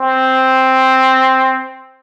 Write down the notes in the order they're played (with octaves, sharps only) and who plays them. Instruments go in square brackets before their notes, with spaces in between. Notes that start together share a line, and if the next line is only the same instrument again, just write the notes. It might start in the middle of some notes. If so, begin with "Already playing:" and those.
Already playing: [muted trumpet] C4